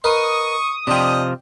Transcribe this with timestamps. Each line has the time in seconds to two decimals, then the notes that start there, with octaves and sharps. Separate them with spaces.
0.04 A#4 B4 D#5 C#6 D#6
0.87 C3 F3 D4 D#5 G5